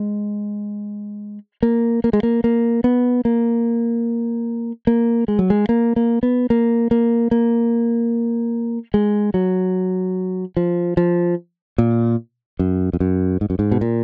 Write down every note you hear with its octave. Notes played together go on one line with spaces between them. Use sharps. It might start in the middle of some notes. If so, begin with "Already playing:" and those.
Already playing: G#3
A#3
A#3
G#3
A#3
A#3
B3
A#3
A#3
G#3
F#3
G#3
A#3
A#3
B3
A#3
A#3
A#3
G#3
F#3
F3
F3
A#2
F#2
F2
F#2
G#2
F#2
G#2
B2
A#2